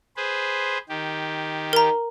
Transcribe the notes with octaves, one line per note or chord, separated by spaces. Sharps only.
G#4 B4 C5
D#3 G4
A#4 A#5